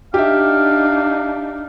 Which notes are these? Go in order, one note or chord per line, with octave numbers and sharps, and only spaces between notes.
D4 D#4 G4 E5 F5